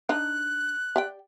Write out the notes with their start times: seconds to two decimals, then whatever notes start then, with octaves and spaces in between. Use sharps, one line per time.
0.09 D4 D#4 F#6
0.96 G4 D5 G5